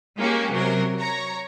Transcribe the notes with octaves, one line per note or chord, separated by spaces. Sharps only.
G#3 A#3 C#4 G4
C3 F#3 A#4
C#5 A#5